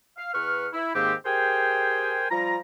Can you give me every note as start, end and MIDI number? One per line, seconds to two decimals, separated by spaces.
0.17 0.31 77
0.33 0.66 40
0.33 0.66 71
0.33 0.66 85
0.33 0.66 89
0.73 0.90 64
0.95 1.13 44
0.95 1.13 51
0.95 1.13 58
0.95 1.13 60
0.95 1.13 67
1.25 2.25 67
1.25 2.25 68
1.25 2.25 70
1.25 2.25 72
1.25 2.25 79
1.25 2.25 80
2.30 2.57 53
2.30 2.57 55
2.30 2.57 65
2.30 2.57 82